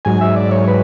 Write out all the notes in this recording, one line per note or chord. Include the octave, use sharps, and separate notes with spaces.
G#2 F#3 G#5
E5
D5
C#5
B4